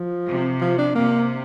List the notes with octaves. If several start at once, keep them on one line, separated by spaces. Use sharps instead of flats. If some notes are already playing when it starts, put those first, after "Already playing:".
Already playing: F3
C3
F3
D4
C3 A#3